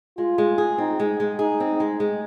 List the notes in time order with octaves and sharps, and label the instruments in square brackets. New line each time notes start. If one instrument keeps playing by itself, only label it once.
[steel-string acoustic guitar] G#3 [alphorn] F4
[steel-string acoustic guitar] G#3
G#4
[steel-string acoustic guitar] C4 [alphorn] D#4
[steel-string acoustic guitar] G#3
G#3
[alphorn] D#4 [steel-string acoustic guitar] G#4
[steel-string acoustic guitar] C4
G#3
G#3